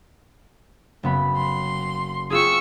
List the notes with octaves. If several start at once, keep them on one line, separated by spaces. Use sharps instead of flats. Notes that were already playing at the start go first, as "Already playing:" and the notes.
F#1 B3 B5
C6
C4 F4 G#4 C#6 E6